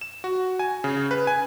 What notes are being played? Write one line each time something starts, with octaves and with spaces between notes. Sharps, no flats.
E7
F#4
G#5
C#3
B4
G#5